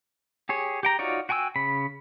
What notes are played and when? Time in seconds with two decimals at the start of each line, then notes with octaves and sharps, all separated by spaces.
0.49 G4 G#4 C#5
0.83 G4 G5 A#5
0.99 D#4 F4 F#4 C#5 D5
1.29 F#4 G5 G#5 C#6 E6
1.56 C#3 B5